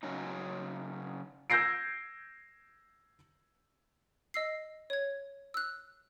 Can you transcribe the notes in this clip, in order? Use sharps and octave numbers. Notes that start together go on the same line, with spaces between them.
C#3 F#3 C#4 D#4
E6 G6 G#6 A#6 C7 D7
D#5 E6 C7
C#5 G#6
E6 F#6